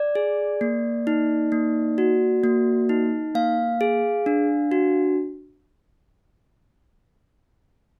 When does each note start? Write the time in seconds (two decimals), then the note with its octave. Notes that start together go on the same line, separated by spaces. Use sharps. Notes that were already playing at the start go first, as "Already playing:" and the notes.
Already playing: D5
0.15 G#4
0.61 A#3
1.07 D#4
1.52 A#3
1.98 F#4
2.44 A#3
2.89 D#4
3.35 A#3 F5
3.81 G#4
4.26 D4
4.72 F#4